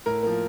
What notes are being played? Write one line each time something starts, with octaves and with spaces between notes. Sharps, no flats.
A2 A#4
F3 A#3